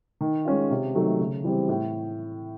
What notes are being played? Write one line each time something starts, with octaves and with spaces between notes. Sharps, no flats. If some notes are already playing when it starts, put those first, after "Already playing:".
D#3
G#3 C#4 F4
C3
D#3 F#3 A3
C#3
E3 G3 C4
A2